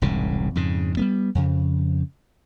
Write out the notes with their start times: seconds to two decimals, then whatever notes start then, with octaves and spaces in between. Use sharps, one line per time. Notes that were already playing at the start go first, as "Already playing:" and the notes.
0.02 E1 C2 G#2 C#3
0.55 F2 G#2 C#3
0.97 G3 A#3 B3
1.35 F2 C#3